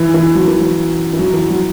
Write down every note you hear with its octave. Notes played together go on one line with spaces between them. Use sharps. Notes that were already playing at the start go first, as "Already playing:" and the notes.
Already playing: E3
E3
F#3
E3
F#3
E3
F#3
E3
F#3